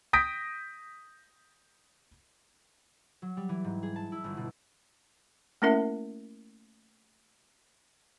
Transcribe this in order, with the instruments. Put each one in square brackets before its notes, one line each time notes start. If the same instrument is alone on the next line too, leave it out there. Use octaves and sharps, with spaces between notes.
[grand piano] D#6 G6 A#6 B6 D7
[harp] F#3
G3
E3
G#2
G#4
A5
E4
G1
B2
[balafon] A3 A#3 C#4 E4 A#4 E5